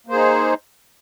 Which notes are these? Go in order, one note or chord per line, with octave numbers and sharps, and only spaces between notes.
A#3 D#4 G#4 C5